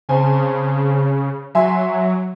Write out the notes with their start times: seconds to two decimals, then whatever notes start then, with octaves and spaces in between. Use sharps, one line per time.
0.09 C#3 C4 G#5 A5
1.55 F#3 E5 G#5 C6